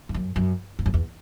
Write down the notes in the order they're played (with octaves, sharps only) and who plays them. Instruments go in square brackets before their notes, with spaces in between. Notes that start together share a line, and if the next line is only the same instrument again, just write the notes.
[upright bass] G2
F#2
F#2
G2
F#2
E2